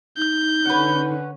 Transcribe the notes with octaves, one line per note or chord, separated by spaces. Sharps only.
D#4 G6
D3 C#4 B4 F#5